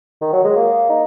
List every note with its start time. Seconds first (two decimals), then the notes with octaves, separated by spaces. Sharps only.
0.21 D#3
0.33 F#3
0.44 G#3
0.56 A#3
0.89 D#4